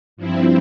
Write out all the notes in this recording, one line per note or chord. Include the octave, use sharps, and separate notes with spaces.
G2 F3 C4 E4